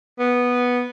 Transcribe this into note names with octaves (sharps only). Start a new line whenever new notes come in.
B3